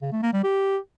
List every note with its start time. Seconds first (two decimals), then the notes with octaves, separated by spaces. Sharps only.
0.02 C#3
0.12 A3
0.23 A#3
0.33 G3
0.44 G4